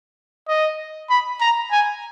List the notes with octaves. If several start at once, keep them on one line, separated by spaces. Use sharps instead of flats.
D#5
B5
A#5
G#5